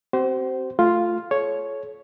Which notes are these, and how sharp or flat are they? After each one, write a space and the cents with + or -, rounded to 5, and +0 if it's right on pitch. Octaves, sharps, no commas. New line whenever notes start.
C4 +0 F#4 +45 C5 -10
A3 +0 F4 +0
A4 -40 C#5 +0